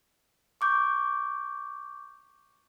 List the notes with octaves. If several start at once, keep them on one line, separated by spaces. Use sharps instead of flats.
C#6 D6 G6